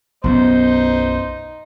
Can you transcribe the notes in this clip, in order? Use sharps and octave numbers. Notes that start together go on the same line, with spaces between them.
B1 F#2 B3 D#4 C5